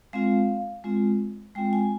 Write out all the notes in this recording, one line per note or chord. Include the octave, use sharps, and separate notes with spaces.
G#3 C4 F4 F5
G#3 C4 F4
G#3 C4 F4 G5
G#5